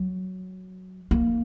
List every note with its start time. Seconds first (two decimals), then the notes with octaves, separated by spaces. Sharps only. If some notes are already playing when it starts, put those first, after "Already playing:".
Already playing: F#3
1.11 A#3